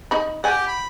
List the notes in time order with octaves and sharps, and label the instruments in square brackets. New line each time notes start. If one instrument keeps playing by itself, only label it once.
[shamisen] D#4 B5
[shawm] G4 [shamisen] F#5 G#5
[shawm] B5